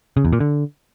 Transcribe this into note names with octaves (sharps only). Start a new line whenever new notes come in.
C#3
E2
A#2
D3